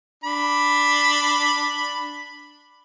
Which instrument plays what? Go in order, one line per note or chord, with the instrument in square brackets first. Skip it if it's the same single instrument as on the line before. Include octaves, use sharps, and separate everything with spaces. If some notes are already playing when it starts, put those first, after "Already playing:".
[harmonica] D4 B5